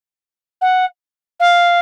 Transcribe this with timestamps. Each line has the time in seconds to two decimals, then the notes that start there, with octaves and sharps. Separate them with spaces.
0.61 F#5
1.40 F5